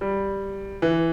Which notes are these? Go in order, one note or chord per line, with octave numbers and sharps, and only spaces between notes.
G3
E3